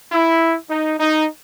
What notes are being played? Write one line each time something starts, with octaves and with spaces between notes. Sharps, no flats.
E4
D#4
D#4